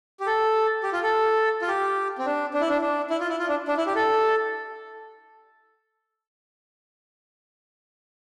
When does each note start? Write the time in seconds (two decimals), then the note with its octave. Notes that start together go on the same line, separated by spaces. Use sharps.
0.20 G4
0.27 A4
0.83 G4
0.92 F4
1.03 A4
1.62 F4
1.68 G4
2.18 C4
2.26 D4
2.54 D4
2.61 E4
2.69 D4
2.82 D4
3.10 E4
3.20 F4
3.30 E4
3.39 F4
3.49 D4
3.68 D4
3.77 E4
3.86 G4
3.95 A4